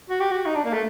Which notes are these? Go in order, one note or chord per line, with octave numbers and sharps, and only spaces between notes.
F#4
G4
F#4
D#4
D4
A#3
A3